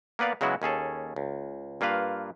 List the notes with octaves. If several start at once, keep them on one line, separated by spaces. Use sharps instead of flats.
A#3 B3 B4 D5 F5
C#3 F#3 G#3 B3 E4 F#4
D#2 C#4 G#4 A4
C#2
G2 A#3 F4 B4 F5